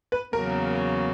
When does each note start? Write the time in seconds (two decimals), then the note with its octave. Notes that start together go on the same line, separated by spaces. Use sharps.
0.12 B4
0.33 E2 C#3 F#3 A#3 A#4